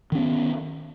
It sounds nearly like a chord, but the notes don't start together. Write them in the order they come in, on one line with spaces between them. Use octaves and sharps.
D#3 C#4 B3